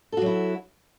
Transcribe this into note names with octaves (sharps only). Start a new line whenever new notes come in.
F#3 E4 F#4 A4